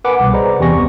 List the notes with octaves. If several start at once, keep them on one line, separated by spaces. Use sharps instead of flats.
A#4 B4 F#5 G#5 D6
C2 B2
G#4 B4 C5 D5 D#5 A#5
E2 C3 G4 G#5 C#6 A#6
G1 C2 B3 C#6